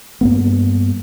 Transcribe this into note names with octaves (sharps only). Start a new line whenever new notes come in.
G2 A#3 B3